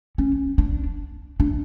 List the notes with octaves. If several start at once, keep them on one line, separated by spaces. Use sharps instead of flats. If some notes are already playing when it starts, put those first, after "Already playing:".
C#4
D4
D4